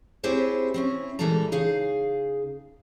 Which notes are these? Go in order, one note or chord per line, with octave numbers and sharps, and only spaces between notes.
C4 E4 G4 G#4 C5 C#5
C4 C#4 E4
A#2 E3 G3 G#3 A4 A#5
C#3 D#4 G#4 F5